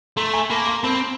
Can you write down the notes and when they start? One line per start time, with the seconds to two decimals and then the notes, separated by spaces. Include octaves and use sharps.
0.17 A3 A#5 C6
0.33 G#5 A#5
0.50 A#3 A5 B5
0.66 A#5 C6
0.84 C4 A5 B5